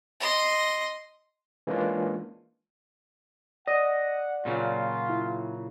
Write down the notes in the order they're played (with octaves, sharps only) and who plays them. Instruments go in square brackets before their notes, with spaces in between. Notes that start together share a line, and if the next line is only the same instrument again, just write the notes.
[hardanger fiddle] D#5 C6
[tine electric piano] E3 G#3 A#3 C#4 D4 F4
[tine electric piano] D5 [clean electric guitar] D#5 [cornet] F#5
[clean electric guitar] A#2 C#3 F#3 [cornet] F4
[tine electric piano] E4